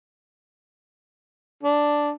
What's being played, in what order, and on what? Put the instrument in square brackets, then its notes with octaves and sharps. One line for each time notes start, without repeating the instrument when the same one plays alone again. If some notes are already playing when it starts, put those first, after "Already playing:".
[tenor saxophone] D4